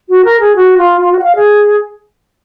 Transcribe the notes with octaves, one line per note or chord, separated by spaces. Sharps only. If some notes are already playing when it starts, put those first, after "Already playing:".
F#4
A#4
G#4
F#4
F4
F4
F#4
F#5
F5
G#4